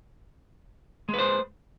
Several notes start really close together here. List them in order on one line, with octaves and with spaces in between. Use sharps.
G#3 B4 C5